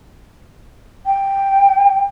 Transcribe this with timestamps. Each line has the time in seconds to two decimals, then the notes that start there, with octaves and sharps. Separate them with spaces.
1.06 G5